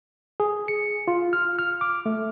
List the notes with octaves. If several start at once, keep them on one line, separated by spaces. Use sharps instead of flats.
G#4
C#7
F4
F6
F6
D6
A3